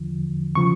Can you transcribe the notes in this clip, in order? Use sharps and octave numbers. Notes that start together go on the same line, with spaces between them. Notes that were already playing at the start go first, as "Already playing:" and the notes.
Already playing: E2 D3 F3
C#3 F3 C#6